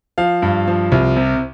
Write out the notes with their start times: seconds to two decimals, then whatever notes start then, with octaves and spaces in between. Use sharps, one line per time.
0.18 F3 F5
0.42 G2
0.67 F3
0.92 C2
1.16 C3